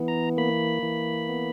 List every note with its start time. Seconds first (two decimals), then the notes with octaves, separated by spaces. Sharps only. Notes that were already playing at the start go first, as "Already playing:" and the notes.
Already playing: E3 B3
0.08 A#5
0.37 A#3 B5
0.83 E3
1.29 B3